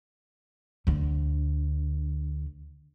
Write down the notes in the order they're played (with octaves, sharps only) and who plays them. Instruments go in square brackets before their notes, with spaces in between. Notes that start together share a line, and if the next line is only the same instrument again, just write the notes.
[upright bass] D2 D3